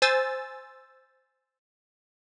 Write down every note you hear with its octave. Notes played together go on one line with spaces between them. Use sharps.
C5 G#5 E6 A6